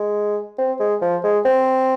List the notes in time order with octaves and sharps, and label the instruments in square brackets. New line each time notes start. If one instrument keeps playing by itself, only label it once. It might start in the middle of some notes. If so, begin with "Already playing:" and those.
Already playing: [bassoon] G#3
C4
G#3
F3
G#3
C4